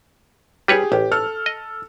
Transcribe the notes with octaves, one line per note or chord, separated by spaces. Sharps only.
G3 G4 G#4 B4 C#5
A1 G4
A4 F6
D#5